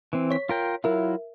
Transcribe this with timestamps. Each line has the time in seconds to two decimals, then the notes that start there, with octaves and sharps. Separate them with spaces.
0.13 E3 C4
0.30 C#5 B6
0.49 F4 A#4 G5
0.84 F#3 E4 F4 A#4 E5